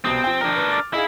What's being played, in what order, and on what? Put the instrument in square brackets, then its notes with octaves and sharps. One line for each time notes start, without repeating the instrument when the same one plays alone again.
[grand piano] C2 B2 D#6 [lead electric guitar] C4
[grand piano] F3 G5
[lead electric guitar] D4 A#4
[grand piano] B4
D6 F6 A6
[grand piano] D#4 G#4 F5 [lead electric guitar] E4